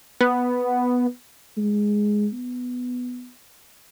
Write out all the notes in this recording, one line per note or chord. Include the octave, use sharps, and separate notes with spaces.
B3
G#3
B3